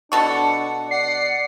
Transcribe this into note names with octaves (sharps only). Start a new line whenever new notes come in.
B2 D4 A4 F#5 C#6
D5 F#5 C7